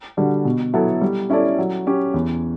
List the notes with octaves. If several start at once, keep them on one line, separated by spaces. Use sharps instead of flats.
D3 G3 D4 F#4
B2
F#3 B3 E4 A4
G3
C#4 E4 A4 D5
F#3
C#4 G4
E2